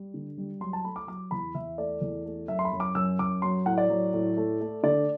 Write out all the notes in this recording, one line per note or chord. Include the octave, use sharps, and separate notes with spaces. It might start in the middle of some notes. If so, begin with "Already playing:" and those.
Already playing: G3
D3
G3
F#3 C6
A5
A3 B5
D6
F#3 D6
E2 B5
E2 E5
A3 D5
E2
A3
F#2 E5
C6
B5
F#2
D6
F#2 E6
F#2 D6
F#3 C6
A2 F#5
D5
F#3
A2
A3
A3
D3 D5